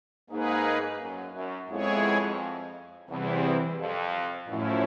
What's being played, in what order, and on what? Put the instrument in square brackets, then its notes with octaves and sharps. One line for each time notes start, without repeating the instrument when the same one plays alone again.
[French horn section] G#2 [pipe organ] A#3 D#4 G#4 B4
[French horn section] F#2
F#2
[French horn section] F2 [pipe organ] G#3 B3 E4 G#4 C#5
[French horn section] E2 [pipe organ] C3 E3 G3 C4 E4
[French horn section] F2
[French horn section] F#2 [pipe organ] A2 F3 A3 C#4 E4